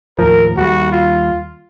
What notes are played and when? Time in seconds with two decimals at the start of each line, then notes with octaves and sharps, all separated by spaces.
0.19 D#2 A2 F3 A#4
0.57 D#2 G3 F#4
0.92 F4